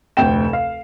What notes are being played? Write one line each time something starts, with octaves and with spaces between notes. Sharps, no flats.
F1 D2 C5 G5 E7
F5